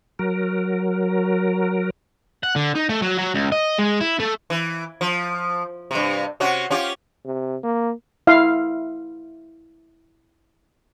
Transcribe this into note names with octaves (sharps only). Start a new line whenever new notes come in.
F#3 A#4
F#5
D3
D#4
A3
F#3
F#3
C#2
D#5
G#3
E4
A3
E3
F3
G2 C3
C3 C#4 F#4
C#4 F4 G4
C3
A#3
E4 F5